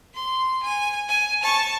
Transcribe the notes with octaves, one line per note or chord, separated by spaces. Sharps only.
C6
G#5
G#5
A5 C#6